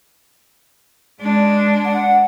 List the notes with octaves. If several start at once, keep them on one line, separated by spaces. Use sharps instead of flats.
G#3 D4
F#5